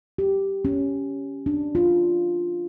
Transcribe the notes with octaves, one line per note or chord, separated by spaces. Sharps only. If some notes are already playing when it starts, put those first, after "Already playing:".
G4
C#4
D4
F4